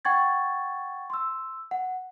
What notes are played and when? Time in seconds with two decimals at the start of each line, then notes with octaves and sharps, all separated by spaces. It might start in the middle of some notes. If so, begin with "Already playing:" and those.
0.05 F#5 G5 C#6 G#6 A6
1.10 C6 E6
1.71 F#5